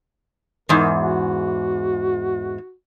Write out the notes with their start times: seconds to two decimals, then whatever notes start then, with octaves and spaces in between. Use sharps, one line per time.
0.69 E2 G#2 A#4
0.98 F#4